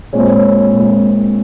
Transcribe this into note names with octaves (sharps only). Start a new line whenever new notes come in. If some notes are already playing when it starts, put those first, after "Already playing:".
A#2 G#3 C4 C#5
C5
C#5
A#2 G#3 C4